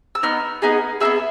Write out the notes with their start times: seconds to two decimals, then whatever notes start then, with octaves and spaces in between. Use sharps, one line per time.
0.15 E6
0.23 B3 D#4 F6
0.62 B3 D#4 G#4
1.00 B3 D#4 G#4 E5 E6